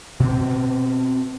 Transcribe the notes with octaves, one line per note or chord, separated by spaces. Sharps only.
B2 C4